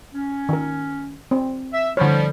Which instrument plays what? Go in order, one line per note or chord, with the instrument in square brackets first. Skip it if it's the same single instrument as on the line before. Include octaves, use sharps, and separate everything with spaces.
[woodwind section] C#4
[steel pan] D#3 A#4
C4
[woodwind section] E5
[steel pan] D3 C#5 [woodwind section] F3 G3